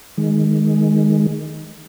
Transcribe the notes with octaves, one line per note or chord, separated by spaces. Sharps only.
D#3 G#3